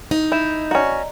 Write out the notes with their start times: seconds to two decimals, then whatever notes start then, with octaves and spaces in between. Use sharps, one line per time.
0.11 D#4
0.32 E4 G6 E7
0.71 C#4 F#4 D5 D#5 A#5